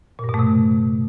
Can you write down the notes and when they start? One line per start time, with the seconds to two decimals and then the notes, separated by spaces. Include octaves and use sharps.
0.19 A#2
0.24 G2
0.29 B2
0.34 A3
0.39 C3